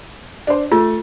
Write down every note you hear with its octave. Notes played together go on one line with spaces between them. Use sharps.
D4 C5
A3 F4 A4